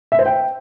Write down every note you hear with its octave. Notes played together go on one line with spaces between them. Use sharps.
E5
C5
G5